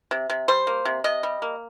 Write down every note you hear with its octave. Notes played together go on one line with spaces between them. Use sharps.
C3
C3
G3 C5
A#3
C3
C3 D#5
G3
A#3